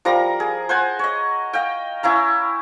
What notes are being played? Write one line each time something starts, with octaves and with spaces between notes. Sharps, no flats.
F3 G3 A#4 A#5
G#4
C5 F#5 G#5
C#5 D#5
D#5 F5 G5
C#4 E4 F5 A#5